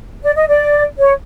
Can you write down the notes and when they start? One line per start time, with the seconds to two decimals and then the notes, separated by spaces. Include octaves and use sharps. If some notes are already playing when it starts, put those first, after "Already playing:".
0.24 D5
0.35 D#5
0.48 D5
0.98 C#5